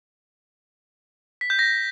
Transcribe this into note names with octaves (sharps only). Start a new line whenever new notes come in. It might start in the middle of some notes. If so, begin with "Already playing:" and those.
B6
G6
A#6